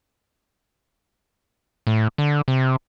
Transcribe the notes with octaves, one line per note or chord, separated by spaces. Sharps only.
A2
D3
C3